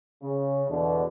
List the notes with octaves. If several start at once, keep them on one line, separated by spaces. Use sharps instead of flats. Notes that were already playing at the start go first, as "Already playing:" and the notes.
C#3
E2 B2 D3 D4